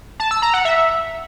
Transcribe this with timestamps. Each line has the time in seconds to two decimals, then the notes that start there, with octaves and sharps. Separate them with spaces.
0.20 A5
0.31 E6
0.42 A#5
0.54 F#5
0.65 E5